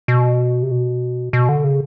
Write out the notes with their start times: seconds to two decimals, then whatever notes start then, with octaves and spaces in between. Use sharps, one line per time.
0.08 B2
0.63 C3
0.71 B2
1.33 B2
1.49 D3
1.64 C#3